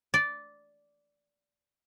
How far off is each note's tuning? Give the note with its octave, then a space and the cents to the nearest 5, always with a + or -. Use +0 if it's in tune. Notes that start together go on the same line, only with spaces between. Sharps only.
D5 -10